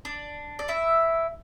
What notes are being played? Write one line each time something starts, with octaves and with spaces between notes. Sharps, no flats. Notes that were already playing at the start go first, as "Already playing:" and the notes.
D4 D5
D5
E4 E5